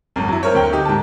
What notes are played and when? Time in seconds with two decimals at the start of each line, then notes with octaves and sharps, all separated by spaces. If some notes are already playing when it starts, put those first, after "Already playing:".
0.16 G#1 F#2
0.28 F#3 E4
0.43 C4 A#4 C#5
0.55 D2 A#4 G5
0.72 D#4 G4
0.85 G#2 A5